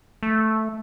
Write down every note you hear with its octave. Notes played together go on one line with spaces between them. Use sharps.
A3